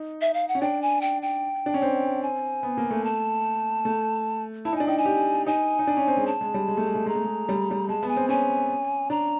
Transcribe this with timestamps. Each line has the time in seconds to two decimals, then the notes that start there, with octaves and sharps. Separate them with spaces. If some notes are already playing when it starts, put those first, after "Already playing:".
Already playing: D#4
0.21 E5
0.34 F5
0.48 F#5
0.55 C#4
0.61 D4 G5
0.82 G#5
1.01 G5
1.22 G5
1.66 D4
1.74 C#4
1.82 C4
2.22 G#5
2.63 B3
2.77 A#3
2.91 A3
3.04 A5
3.85 A3
4.65 E4 A5
4.73 D#4
4.76 D4 G#5
4.87 D#4 G5
4.98 G#5
5.05 G4
5.47 D#4 G#5
5.79 D#4
5.87 D4
5.97 C#4
6.08 C4
6.17 G#3
6.27 A5
6.41 G#3
6.54 G3
6.68 G#3
6.77 A3
6.87 G#3
6.95 A3
7.06 G#3 A#5
7.15 A3
7.24 G#3
7.49 G3
7.71 G3
7.89 G#3 A5
8.03 B3
8.09 G#5
8.16 C4
8.29 C#4 G#5
9.10 D4 A#5